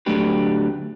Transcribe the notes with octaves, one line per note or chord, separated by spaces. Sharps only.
D2 F#3 A3 D4 G4 B4